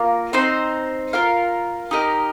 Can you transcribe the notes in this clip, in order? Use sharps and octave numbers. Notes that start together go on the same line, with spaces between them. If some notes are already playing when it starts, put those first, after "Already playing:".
Already playing: A#3 F4 A#4
C4 D#4 C5
F4 A#4 F5
D#4 G4 A#4 D#5